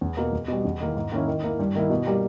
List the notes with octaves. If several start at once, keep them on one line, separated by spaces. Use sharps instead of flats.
E2
B2 A#3
E2
B2 G3
E2
D#3 A#3 E4
G#2
D#3 A#3 C#4 E4
D#3
A#3 E4
G2
D#3 A#3 E4
B2
G3 A#3